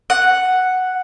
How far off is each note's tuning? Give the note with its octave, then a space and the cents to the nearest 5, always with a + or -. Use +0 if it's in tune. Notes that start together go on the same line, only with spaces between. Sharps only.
F#5 +0